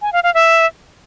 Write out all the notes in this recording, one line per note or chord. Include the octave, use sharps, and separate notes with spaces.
G#5
F5
F5
E5